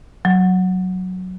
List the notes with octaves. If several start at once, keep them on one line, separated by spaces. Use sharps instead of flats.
F#3